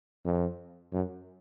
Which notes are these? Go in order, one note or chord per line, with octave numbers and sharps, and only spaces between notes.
F2
F#2